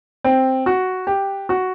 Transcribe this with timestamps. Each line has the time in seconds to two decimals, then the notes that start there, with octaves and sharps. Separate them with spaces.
0.24 C4
0.66 F#4
1.07 G4
1.49 F#4